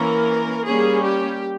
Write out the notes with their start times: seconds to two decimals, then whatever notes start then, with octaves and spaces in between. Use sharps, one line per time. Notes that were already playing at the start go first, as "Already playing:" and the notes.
Already playing: E3 A#3 C#4 A#4
0.65 G3 A#3 C#4 G#4
1.04 G4